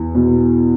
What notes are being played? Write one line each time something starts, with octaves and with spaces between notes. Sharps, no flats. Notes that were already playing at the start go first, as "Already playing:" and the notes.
Already playing: E2
B2